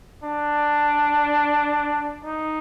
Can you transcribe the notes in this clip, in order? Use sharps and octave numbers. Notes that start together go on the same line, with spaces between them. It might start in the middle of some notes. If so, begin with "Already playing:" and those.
D4
D#4